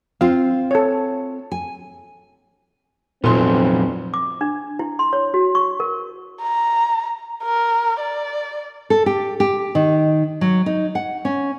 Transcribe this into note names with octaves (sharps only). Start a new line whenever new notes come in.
C4 F4 F5
A4 C#5
G#5
F1 A#2 F3 F#3 B3 C4 C6
D6
D4
E4
C6
C#5
F#4
C#6
A#4
A#5
A#4
D5
A4
G4
G4
D#3
F#3
D#4
F#5
C#4